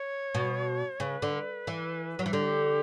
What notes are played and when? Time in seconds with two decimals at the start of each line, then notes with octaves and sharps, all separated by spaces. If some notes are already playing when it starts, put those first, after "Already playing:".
Already playing: C#5
0.35 B2
1.00 C#3 B4
1.22 D3
1.67 E3
2.19 F#3
2.26 E3
2.33 D3 G4